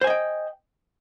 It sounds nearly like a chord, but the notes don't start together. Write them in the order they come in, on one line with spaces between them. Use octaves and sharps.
C5 G#5 D#5 G5